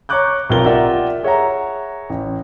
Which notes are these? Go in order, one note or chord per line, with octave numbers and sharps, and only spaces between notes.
C#5 A#5 C#6 D6 F#6 G6
B1 C3 F4 G4 A#4 G7
F4 G4 A#4 D5 E5 F#5
G#4 C#5 E5 F#5 A#5
A1